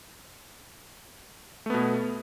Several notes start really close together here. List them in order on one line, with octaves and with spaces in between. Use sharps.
A3 B3 B2